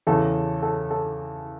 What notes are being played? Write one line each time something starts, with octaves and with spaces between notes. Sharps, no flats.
E2 C#3 E3 A4
A4
A4